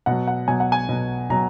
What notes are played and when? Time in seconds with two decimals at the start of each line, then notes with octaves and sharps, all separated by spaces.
0.06 B2 F#3 F#5
0.27 F#5
0.48 B2 F#3 G#5
0.60 F#5
0.72 G#5
0.89 B2 F#3
1.30 B2 F#3 A#5